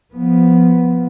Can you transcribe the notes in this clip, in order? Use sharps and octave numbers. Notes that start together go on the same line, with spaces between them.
F3 B3